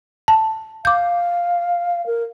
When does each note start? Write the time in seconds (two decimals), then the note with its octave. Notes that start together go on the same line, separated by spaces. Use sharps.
0.28 A5
0.85 F5 D6 G6
2.06 A#4